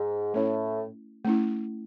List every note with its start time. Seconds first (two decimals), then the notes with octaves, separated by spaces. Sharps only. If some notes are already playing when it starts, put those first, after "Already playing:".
Already playing: G#2
0.34 A2 A3 C#4 E4
1.25 A3 C#4 E4